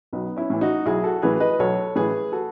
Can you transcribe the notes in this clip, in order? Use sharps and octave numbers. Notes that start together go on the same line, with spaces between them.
B1 B3 D#4
C#4 E4
A2 E3
D#4 F#4
B1 E4 G#4
F#4 A4
A2 E3 G#4 B4
B4 D#5
B1 A4 C#5
A2 E3 G#4 B4
F#4 A4